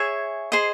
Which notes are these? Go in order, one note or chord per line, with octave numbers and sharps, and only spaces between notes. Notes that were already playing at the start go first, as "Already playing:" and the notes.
Already playing: G#4 C#5 E5 G#5
G#4 C5 D#5